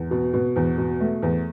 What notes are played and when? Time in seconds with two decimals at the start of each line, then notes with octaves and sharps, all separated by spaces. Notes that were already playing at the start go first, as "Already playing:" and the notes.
Already playing: E2
0.11 B2
0.33 B2
0.56 E2
0.78 B2
1.01 A3
1.23 E2